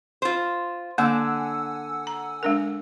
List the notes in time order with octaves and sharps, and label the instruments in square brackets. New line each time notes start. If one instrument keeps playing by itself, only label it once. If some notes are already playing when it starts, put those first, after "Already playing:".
[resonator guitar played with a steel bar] F4 C5
[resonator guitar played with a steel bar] D3 [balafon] A#3 [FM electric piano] F#5 G#5 E6
[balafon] A#5
G#3 D4 A#4